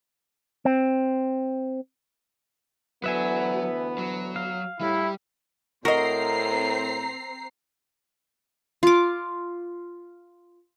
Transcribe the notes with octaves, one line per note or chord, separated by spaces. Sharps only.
C4
D2 E3 F#3 B3 B4 E5 G#5
F#3
F5
A2 G3 E4
A2 C4 F#4 A#4 D#5 A#5 C7
F4 D6